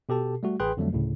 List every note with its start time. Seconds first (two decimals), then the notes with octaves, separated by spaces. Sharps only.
0.09 B2 G4 A4 A5
0.43 G3 A3 F#4
0.60 A1 G#4 B4 G5 C6 F#6
0.77 F2 D3 F#3 G3 A3
0.93 D2 A2 C#3